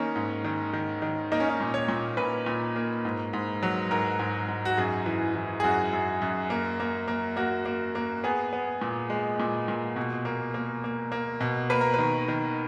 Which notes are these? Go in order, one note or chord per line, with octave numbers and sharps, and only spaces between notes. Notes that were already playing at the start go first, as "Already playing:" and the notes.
Already playing: D#3 A#3 C#4 D#4
G#2
D#3
D#3
D#3
A#3 D#4
C#4
D#4
A#2
C#5
A#2
A#2 B4
A#2
A#3
G#2
G#2
F#3
G#2 A#4
G#2
G#2
F#4
F#2 G#4
E3
E3
G#4
F#2 F#4
F#2
F#2
A#3
A#3
A#3
A#3 F#4
A#3
A#3
B3 G#4
B3
A#2
G#3
A#2
A#2
B2
A#3
A#3
A#3
A#3
B2
A#3 B4
A#4
D#3 B4
D#3